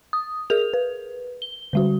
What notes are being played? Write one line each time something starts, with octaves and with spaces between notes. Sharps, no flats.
D#6
G#4 A#4 F7
B4
G7
D3 G3 F#4